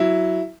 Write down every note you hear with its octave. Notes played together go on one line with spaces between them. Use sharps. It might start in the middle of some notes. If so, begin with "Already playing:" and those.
Already playing: F#3 E4